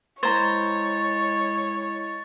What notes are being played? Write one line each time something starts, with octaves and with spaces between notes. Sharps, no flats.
G#3 E4 C5 C#5 A#5 G#6 A6